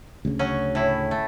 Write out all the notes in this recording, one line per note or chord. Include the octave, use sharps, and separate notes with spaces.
D2 C#3
F#3 C#4
A2 E4
A3